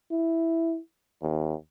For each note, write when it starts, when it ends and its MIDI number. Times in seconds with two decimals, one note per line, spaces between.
0.12 0.79 64
1.22 1.54 39